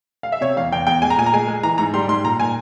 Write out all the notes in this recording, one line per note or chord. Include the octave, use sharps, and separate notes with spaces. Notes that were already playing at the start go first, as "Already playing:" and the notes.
F5
E5
C3 C#5
E2 F5
E2 G5
E2 G5
G#3 G#5
A#5
A#2 G#5
A#5
G#3 G#5
G#3
E3 A#5
G#2 A#5
G3 C6
G#2 C6
A#2 A#5
A#2 G#5